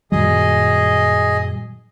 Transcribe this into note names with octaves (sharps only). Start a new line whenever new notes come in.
F#2 A#2 D#3 F#3 G3 G#4 D#5